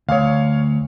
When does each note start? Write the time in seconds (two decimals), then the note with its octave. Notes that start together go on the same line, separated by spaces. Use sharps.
0.09 D2 C#5 F5